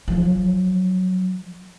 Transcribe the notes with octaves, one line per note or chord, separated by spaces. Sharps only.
F3 F#3